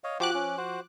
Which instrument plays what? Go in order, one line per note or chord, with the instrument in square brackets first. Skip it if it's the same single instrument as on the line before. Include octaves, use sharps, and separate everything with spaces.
[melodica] C#5 D#5 F5
[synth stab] F3 D6 F#6 [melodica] F#4 G4
[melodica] C#4
F#4 C5